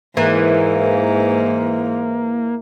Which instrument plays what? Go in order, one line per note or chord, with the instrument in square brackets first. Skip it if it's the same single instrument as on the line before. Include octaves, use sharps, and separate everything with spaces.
[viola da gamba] G#2 [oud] E3 [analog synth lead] A#3